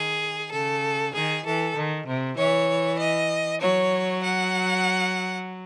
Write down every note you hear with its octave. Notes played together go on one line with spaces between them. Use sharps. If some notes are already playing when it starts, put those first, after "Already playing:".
Already playing: D#3 G#4
C#3 A4
D#3 G#4
E3 A4
D#3
C3
E3 C#5
D#5
F#3 C#5
F#5